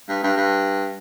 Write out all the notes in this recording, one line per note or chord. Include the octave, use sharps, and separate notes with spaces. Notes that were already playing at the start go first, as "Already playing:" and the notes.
G2
G2
G2